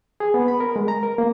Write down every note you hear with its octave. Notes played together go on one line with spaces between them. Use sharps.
G#4
B3
B5
A#4
G#3
A#5
A#4
A#3